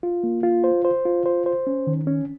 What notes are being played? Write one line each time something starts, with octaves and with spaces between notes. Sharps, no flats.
F4
A#3
F4
C5
C5
F4
C5
C5
C#4
D#3
C#4